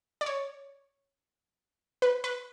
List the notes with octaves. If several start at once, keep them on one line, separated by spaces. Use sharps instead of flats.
D5
C#5
B4
B4